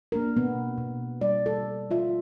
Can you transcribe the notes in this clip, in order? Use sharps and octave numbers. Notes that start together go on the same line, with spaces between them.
A#3 D4 A#4
B2 B3
B2
G3 D5
A4
F4 E5